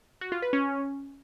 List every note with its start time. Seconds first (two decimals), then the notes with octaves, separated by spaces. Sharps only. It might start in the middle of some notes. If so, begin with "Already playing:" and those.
0.21 F#4
0.32 F4
0.42 B4
0.53 C#4